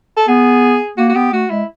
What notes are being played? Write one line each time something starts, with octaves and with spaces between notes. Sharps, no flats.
A4
B3 G#4
A#3 F#4
F#4
B3 G4
A3 F#4
G#3 E4